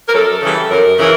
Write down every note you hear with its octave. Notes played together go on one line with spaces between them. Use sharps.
A#4
F#2 A4
C#3 E3 G3
F#2 A#4
C#3 E3 A#4